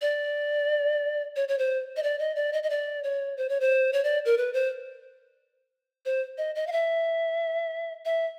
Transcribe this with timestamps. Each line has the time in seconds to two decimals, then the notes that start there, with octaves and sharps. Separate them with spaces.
0.01 D5
1.36 C#5
1.48 C#5
1.59 C5
1.96 D#5
2.03 D5
2.19 D#5
2.36 D5
2.53 D#5
2.63 D#5
2.70 D5
3.04 C#5
3.37 C5
3.49 C#5
3.60 C5
3.93 C#5
4.04 D5
4.25 A#4
4.38 B4
4.53 C5
6.05 C5
6.38 D#5
6.55 D#5
6.67 F5
6.72 E5
8.05 E5